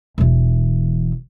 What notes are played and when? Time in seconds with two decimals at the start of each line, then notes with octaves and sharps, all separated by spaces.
0.18 E1 E3